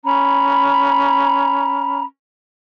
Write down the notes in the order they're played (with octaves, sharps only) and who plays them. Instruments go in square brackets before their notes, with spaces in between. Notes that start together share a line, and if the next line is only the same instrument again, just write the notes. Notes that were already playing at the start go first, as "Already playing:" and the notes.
[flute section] C#4 A#5 B5